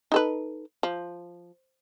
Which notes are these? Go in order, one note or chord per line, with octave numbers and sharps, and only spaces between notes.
D#4 A4 B4
F3